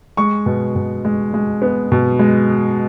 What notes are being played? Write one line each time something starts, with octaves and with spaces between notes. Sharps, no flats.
G#3 C#6
B2
B2
G#3
G#3
B3
B2
G#3